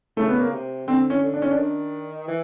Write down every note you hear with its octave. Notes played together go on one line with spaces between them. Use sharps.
C#3 A3
B3
A#3
C3
D3 C4
C#4
D3
D4
C#4
D4
D#3
E3